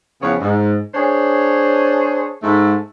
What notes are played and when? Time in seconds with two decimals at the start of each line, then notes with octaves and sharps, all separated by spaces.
0.22 E2 C#3 F3 B3 C#5
0.39 G#2
0.94 D4 G#4 C5 C#5
2.42 G#2 A3